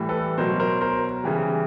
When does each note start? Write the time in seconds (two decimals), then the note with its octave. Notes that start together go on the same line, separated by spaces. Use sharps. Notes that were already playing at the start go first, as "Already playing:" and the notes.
Already playing: A2 E3 G3
0.09 A4 B4
0.38 B2 F#3 A#4 C5
0.60 A#4 C5
0.81 A#4 C5
1.24 C#3 E3 G3